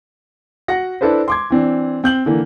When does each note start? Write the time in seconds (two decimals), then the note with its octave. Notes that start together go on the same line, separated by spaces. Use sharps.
0.68 F#4 F#5 A#6
1.01 D4 E4 A4 B4 C5
1.28 C6 D6 G#6
1.50 E3 C4 D4
2.04 C4 G6 F#7
2.26 D3 E3 A#3